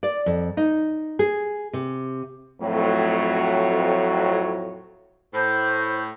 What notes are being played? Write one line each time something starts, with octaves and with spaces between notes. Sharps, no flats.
D5
F2
D#4
G#4
C3
F2 A2 F#3
A2 C5